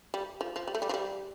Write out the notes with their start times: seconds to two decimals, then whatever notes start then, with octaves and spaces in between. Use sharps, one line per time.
0.14 G3
0.41 F3
0.56 F3
0.68 G3
0.75 A3
0.82 G3
0.89 F3
0.94 G3